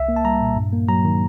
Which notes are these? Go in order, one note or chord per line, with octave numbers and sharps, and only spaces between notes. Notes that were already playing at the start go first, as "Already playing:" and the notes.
Already playing: C2 E5
A#3
A5
G3 A#5
A#2
G2
A#3
F#3 A#5
D#3